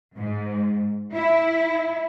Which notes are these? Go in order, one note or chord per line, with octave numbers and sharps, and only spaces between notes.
G#2
E4